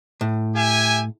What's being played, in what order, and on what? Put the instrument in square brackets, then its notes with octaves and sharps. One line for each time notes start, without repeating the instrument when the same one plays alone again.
[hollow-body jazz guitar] A2
[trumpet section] G4 E5 G#5